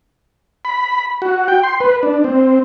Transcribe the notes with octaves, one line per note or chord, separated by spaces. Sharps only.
B5
F#4
G5
C6
B4
D4
C4